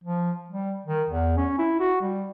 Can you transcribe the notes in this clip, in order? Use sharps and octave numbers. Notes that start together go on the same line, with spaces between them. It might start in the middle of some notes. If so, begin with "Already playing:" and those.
F3
G3
D#3
E2
C#4
E4
F#4
G3